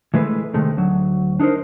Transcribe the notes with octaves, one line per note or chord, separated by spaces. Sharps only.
E3 G#3 A3 B4
C3 D#3 G#3 A3
D2 F#3
D4 D#4 G4 A#4 C5